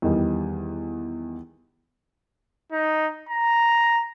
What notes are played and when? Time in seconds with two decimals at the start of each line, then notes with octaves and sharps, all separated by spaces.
0.02 E2 D#3 G3
2.72 D#4
3.29 A#5